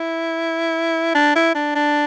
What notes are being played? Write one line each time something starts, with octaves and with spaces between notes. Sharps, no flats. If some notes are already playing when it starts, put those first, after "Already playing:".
Already playing: E4
D4
E4
D4
D4